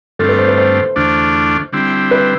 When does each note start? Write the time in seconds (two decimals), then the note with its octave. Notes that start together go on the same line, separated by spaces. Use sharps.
0.19 G2 D3 A3 C4 F4 A4
0.29 B4
0.39 C5
0.48 B4
0.58 C5
0.96 E2 D3 A3 D4 F4
1.73 D3 G3 C4 E4
2.11 B4